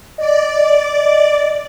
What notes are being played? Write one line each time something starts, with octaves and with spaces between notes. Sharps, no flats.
D5 D#5